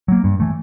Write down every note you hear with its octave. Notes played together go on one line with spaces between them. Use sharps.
F#3 A#3
G2
E3 A3